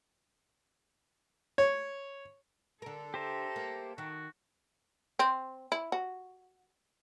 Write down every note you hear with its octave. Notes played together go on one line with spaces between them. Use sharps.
C#5
D3 A4 A#4
G4 C5 E5 A#5
A#3
D#3 F#4
C4
E4
F#4